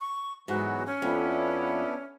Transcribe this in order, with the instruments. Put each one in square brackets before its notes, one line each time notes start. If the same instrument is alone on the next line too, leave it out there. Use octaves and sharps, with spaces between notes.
[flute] C#6
[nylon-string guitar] G#2 [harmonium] E3 F#3 B3 [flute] F#4
[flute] C#4
[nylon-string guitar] F2 [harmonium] B3 D4 E4